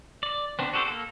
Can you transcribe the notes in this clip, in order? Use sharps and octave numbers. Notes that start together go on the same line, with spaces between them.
D5
B3 C4 D4
F#4 G4 A4 B4 C5
A#3 A4